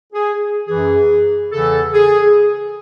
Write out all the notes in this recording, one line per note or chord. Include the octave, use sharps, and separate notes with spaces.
G#4
F#2 E3 G#4
E2 C#3 E3 A4
G#4